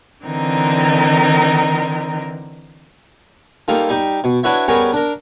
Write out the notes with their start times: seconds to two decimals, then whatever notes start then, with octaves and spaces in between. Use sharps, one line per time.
0.24 D3 E3 C4 D#4 A#4
3.68 G3 A#3 D#4 F4 A4
3.89 G3 D#4 G4
4.24 B2
4.43 D4 E4 F#4 B4 C#5 E5
4.68 G3 B3 C#4 G#4 A#4 C#5
4.93 D4 A#4